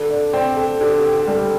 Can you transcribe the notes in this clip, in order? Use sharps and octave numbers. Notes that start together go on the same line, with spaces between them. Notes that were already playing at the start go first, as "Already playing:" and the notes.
Already playing: D3 A4
D5
C4 D5
A4
D3 G4
G4
G4
G3 A4